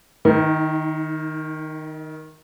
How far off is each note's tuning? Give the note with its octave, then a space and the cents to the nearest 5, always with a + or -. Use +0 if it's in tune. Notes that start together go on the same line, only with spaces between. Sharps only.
D#3 +0 D#4 +45